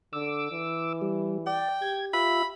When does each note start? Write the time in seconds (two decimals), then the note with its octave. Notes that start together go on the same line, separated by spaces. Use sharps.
0.13 D3 D6 E6
0.52 E3
1.02 G3
1.47 D5 G5
1.82 G4 G#6
2.13 F4 E5 B5